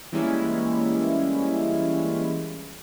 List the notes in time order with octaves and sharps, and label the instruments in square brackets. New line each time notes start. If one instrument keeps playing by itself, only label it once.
[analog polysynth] E3 G3 G#3 A#3 C#4 E4